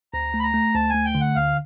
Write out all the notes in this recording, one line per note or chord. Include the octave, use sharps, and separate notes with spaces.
D2 A#5
A3
B5
A#5
A3
D2 A5
A3 G#5
G5
D3
F#5
D2 F5